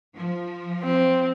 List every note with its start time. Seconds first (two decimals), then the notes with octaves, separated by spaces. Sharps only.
0.16 F3
0.84 C4